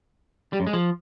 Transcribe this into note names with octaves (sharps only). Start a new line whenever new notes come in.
G3
F#2
G#3
F3